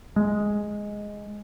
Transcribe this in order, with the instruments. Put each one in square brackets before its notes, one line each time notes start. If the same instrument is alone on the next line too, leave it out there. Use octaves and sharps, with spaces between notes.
[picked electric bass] G#3